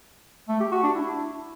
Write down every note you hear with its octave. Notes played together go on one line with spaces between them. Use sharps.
A3
G4
F#4
D4
E4